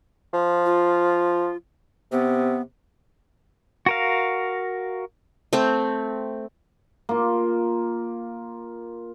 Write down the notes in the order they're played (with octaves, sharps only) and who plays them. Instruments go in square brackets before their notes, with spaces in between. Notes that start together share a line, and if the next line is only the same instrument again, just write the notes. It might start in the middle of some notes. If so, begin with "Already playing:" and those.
[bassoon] F3
[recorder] F4
[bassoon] C3 [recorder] B3
[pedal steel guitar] F#4 A#4 F5
[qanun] A3 C4
[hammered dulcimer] A#3 F4